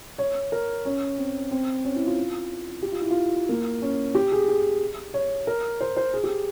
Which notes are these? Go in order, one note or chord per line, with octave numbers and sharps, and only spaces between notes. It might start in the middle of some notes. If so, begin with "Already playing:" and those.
C#5
A#4
C#4
C4
C4
C#4
E4
F4
G4
F4
E4
F4
A#3
C#4
G4
G#4
G#4
C#5
A#4
C5
C5
G#4
G4